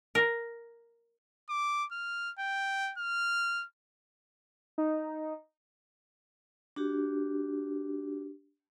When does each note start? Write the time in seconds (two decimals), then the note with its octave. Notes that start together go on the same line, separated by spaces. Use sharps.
0.15 A#4
1.49 D6
1.92 F6
2.39 G5
2.98 F6
4.78 D#4
6.76 D4 F#4 G4